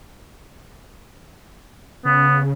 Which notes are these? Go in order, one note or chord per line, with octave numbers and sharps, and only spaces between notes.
C#3 B3